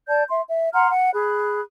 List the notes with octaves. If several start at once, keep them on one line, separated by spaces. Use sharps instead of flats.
D5 A5 G6
E5 C6
E5
F#5 A#5 C6 F6
F#5
G#4 B5 F#6